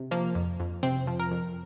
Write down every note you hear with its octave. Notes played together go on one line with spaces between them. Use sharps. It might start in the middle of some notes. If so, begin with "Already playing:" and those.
Already playing: C3
F3 A#3
F2
F2
C3 C4
F3
A#4
F2